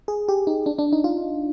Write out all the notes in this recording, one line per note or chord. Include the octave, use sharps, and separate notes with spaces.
G#4
G4
D#4
D4
D4
D#4
F4